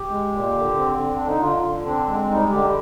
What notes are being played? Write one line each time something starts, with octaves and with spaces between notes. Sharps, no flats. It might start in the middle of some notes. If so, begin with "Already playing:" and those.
Already playing: G4
G#3
A#2
D3
C4
D3
D3 D4
D#4
D3 F4
D3
C4 D4
G#3
G3 D#4
D3 G4